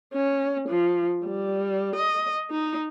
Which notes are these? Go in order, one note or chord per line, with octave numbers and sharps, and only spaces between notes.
C#4
F3
G3
D#5
D#4